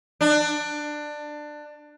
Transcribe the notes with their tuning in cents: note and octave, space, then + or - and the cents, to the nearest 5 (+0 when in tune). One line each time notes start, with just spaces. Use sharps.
D4 +20